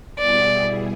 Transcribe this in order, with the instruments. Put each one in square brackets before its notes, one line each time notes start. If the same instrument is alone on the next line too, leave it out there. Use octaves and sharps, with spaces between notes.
[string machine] B2 G3 B3 E4 G#4 [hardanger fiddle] D5